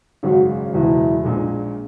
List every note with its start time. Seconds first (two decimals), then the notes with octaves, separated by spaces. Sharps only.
0.23 G#1 F#2 C#3 G#3 F#4
0.73 F#1 E2 B2 G#3 E4
1.24 A#1 A#2 G#3